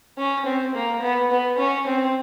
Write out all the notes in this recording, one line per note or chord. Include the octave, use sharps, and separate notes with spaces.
C#4
C4
A#3
B3
B3
C#4
C4